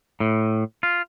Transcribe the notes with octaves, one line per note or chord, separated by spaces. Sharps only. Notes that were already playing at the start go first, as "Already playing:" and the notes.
A2
F4